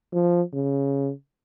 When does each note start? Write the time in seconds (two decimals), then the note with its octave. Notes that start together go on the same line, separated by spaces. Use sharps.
0.13 F3
0.54 C#3